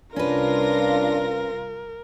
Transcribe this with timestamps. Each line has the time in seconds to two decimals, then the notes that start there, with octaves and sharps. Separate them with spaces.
0.16 C2 C#4 D4 F4 A#4 B4 A#6